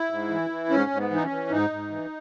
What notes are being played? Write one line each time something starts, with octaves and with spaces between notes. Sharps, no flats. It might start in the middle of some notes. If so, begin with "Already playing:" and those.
Already playing: E4
G#2
E3
E3
G#2 C#4
G#2
B3
E3 D#4
C#4
E3
G#2 D#4
G#2
E3